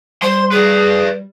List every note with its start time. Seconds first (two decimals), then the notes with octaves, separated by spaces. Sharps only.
0.22 G3 C5 C6
0.51 G#4 B4 D5